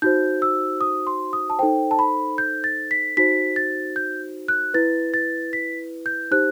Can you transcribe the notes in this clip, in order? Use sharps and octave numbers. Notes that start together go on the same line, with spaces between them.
D#4 F#4 C5 G6
E6
D#6
C6
D#6
A5
D#4 A4 C5 G5
A5
B5
G6
A6
B6
D#4 F#4 C5 B6
A6
G6
F#6
E4 B4 A6
A6
B6
G6
D#4 G4 C5 F#6